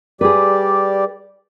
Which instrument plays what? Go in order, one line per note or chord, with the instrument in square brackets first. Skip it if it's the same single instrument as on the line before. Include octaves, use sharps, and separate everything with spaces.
[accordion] G3 G4 D5 [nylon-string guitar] G#4 B4